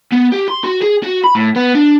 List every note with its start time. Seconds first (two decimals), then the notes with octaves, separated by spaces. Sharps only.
0.13 B3
0.32 G4
0.48 C6
0.64 F#4
0.82 G#4
1.04 F#4
1.24 B5
1.35 A2
1.56 B3
1.75 D4